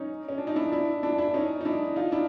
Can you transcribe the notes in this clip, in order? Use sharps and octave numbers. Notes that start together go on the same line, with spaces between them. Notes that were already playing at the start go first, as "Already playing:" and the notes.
Already playing: C#4 D#4
C#4
D4
D#4
D4 E4
D4 E4
D4 E4
D4 E4
C#4 D#4
D#4
D4 E4
D#4 F4
D4 E4